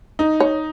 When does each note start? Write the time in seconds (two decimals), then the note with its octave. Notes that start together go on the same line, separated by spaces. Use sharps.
0.19 D#4
0.40 C#5